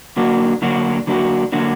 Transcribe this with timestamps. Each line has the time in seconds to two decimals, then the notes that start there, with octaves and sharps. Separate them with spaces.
0.17 D3 F#3 A#3 D4 F#4
0.62 D3 F#3 A#3 D4 F#4
1.07 D3 F#3 A#3 D4 F#4
1.52 D3 F#3 A#3 D4 F#4